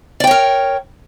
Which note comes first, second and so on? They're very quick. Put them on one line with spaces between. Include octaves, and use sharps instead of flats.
D5 G5 C#5 A#4